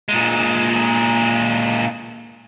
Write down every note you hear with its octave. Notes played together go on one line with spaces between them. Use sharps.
A#2 G#3